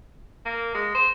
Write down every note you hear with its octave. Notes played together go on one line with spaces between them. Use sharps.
A#3
G#3
C5